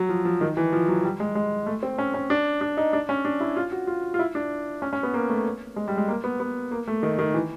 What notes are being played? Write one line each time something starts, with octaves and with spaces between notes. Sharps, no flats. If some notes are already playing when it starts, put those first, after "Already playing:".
Already playing: F#3
F3
F3
D#3
E3
F3
F#3
G3
G#3
G#3
A3
C4
C#4
C#4
D4
D4
D#4
D4
C#4
D4
E4
F4
F#4
F4
F4
E4
D4
C#4
C#4
B3
A#3
A3
G#3
G3
G#3
A#3
B3
B3
A#3
A3
D#3
D#3
E3